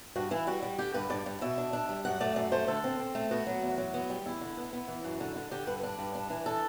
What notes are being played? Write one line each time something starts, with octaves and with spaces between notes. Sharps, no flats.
G2 F#4
E3 E4
G3 F#4
G3
D3 G4
G2 B4
G2 D5
G2
B2 E5
D4
D4
G3
F#2 F#5
A3 D5
F#2 D5
A3 C5
D3 A4
C4
C4
A3
B3 F#4
F#3
E2
F#3
B3
G3
E2 E4
D3
B3
B3
E3
F#2
D3
D3
D3 G4
G2 B4
D4
G2
D4
E3
D4 A4